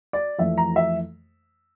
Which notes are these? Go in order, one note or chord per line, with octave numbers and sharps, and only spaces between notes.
D5
F2 E3 A3 E5
A#5
E5